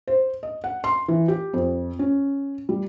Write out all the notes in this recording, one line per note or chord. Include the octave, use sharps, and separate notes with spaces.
C5
D#5
F#5
C6
E3
G4
F2
C#4
G3